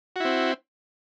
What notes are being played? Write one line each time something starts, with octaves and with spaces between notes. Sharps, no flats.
C4 E4 F#4